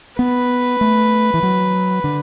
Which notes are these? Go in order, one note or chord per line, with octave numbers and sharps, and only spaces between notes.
B3 B4
A3
E3
F#3
D3